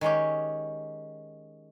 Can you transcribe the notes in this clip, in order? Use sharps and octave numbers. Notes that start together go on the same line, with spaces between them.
D#3 G#3 C#4 G4